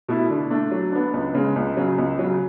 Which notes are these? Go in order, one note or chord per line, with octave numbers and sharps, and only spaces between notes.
B2 A3 E4
D3
A3 D4
F#3
B3 D4
C#2
C#3 G#3
C#2
C#3 F#3
C#2
C#3 F#3